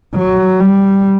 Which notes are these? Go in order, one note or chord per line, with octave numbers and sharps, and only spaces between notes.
F#3
G3